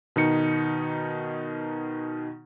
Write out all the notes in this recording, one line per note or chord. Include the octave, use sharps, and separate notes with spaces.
B2 D#3 D#4 C#7